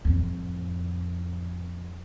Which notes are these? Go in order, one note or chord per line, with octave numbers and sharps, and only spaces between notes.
F2 A2